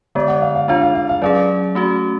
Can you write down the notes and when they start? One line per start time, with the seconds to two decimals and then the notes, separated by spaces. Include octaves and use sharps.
0.15 D3 G#3 B3 D5
0.28 F#5
0.42 F5
0.55 F5
0.68 G#3 D4 F4 F5
0.82 F5
0.95 F5
1.09 F5
1.22 F#3 C#4 G#4 D5
1.75 A3 C#4 F#4